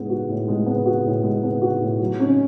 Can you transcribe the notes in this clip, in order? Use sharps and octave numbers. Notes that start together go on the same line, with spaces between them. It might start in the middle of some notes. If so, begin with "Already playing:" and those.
Already playing: A2 G#3 B3
F#4
A2
G#3
B3
F#4
A2
G#3
B3
F#4
A2
F#3
C#4